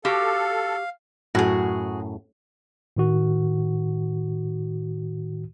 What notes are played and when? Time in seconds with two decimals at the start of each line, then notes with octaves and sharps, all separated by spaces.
0.05 F#4 G4 A4 F5
1.35 F#2 A2 F#4 G#4
2.97 A2 D#3 F#4